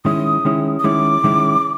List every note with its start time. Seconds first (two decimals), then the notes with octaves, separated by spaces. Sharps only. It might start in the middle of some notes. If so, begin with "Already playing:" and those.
0.05 D#3 G#3 C#4 E4 D#6
0.45 D#3 G#3 C#4 E4
0.79 D#6
0.84 D#3 G#3 C#4 E4 D6
1.24 D#3 G#3 C#4 E4